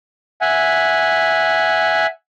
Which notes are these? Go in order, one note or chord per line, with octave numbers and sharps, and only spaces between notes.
E5 F#5 G#5